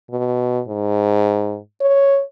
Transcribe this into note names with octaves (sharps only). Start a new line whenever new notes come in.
B2
G#2
C#5